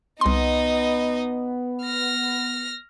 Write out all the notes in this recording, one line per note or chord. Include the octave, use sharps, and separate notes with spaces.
C2 B3 D#4 D#5 C6
F6 A#6